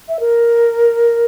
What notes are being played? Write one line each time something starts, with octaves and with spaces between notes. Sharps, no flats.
E5
A#4